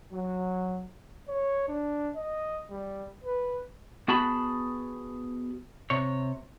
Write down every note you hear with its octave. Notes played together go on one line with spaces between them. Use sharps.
F#3
C#5
D4
D#5
G3
B4
B3 F#4 G#4 A5 B5
C3 C#5